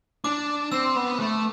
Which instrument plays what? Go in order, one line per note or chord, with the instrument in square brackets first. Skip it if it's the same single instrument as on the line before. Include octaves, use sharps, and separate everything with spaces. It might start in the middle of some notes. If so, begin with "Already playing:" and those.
[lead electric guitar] D4 [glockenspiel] D6
[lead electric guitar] C4 [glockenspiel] E6
[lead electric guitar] B3
A3